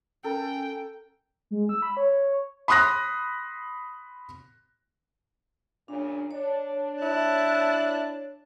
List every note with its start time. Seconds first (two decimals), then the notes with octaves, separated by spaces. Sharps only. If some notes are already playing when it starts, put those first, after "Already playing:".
0.24 C#4 A4 A#4 G5
1.51 G#3
1.69 E6
1.82 B5
1.97 C#5
2.68 B5 C6 D#6 F#6 A#6
5.88 F#2 A#2 C#3 D4
6.31 D4 C#5
7.02 E4 A5 F#6